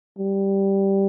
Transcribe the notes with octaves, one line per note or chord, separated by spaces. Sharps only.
G3